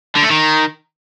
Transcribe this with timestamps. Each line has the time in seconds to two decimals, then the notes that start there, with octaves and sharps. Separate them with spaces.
0.15 D3
0.23 A3
0.30 D#3